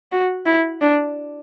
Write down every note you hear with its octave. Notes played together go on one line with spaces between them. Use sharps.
F#4
E4
D4